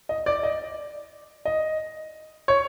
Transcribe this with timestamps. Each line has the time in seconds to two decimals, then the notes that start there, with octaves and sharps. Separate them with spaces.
0.09 D#5
0.26 D5
0.43 D#5
1.45 D#5
2.48 C#5